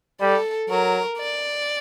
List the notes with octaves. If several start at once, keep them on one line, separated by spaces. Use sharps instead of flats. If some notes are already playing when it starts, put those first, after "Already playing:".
G3 A4
F#3 A#4
D5